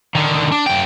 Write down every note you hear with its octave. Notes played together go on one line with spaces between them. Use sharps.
D3 D#3
D4
F#2 G5